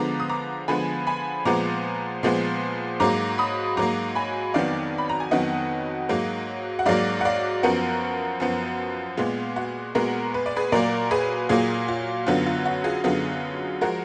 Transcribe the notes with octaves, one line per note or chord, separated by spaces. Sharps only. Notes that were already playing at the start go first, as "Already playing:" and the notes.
Already playing: D3 F3 G#3 B3 A#5 D6
D#6
A#5 D6
D3 F3 G#3 B3 G#5 B5
G#5 B5
A#2 F3 G#3 B3 A#5 D6
A#2 F3 G#3 B3
G#2 F#3 A#3 A#5 D6
B5 D#6
G#2 F#3 A#3 A#5 D6
G#5 B5
F2 D#3 F#3 B3 D5 F5
B5
A#5
G#5
F2 D#3 F#3 B3 D#5 F#5
G#2 F#3 A#3
F#5
G#2 F#3 A#3 D5 F5
F#5
D5 F5
F#2 F3 B3 F#4 A#4
F#2 F3 B3
A#2 G#3 B3 F4
F#4
A#2 G#3 B3 F#4 A#4
B4
D5
G#4 B4
A#2 F#3 A#3 A#4 D5
G#4 B4
A#2 F#3 A#3 F4 G#4
F4
F#2 D3 F#3 B3 F4
F4
F#4
F4 G#4
F#2 D3 F#3 B3 F4 G#4
F3 G#3 F#4 A#4